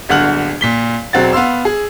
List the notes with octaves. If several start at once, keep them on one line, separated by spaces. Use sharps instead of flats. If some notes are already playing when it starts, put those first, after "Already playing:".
D1 G1 D3 F#5 F6 F#7
A#2 B6 G7
E1 F#3 C4 F#5 A6
B3 F5 C6 E6
G#4